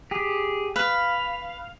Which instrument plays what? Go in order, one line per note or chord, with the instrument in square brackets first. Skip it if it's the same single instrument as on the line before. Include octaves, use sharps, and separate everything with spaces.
[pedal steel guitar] G4 G#4
[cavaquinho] B4 [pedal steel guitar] F5